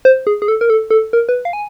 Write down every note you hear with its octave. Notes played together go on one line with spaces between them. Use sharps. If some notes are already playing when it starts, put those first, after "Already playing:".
C5
G#4
G#4
A4
A#4
A4
A4
A#4
B4
F5
G#5